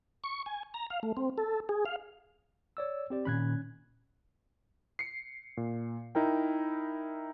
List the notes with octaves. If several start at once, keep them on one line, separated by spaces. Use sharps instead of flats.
C#6
G#5
A#5
F5
A3
C4
A4
G#4
F5
C#5 D5 E6
C4 G4 D5
A#2 D#3 C#4 B5 F#6 G#6
C7 C#7
A#2
D#4 E4 A#4 G5